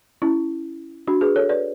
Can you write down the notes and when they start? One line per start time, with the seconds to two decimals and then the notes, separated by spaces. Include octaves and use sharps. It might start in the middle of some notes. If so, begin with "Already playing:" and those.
0.22 C#4 E4
1.08 D4 F#4
1.21 G#4 B4
1.36 A4 C#5
1.49 B4 D5